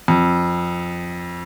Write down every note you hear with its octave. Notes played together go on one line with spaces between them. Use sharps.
F2